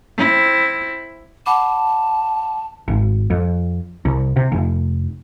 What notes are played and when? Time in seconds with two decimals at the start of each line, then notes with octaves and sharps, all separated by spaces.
0.18 C4 E4
1.46 F#5 A5 B5 D6
2.88 G#1
3.30 F2
4.05 C2
4.36 C3
4.52 F1